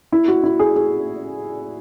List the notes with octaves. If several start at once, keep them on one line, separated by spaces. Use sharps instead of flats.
E4
F#4
E4
G#4
G#4